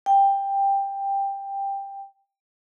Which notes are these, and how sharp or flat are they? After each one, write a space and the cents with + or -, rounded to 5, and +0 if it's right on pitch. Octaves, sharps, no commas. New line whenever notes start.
G5 +10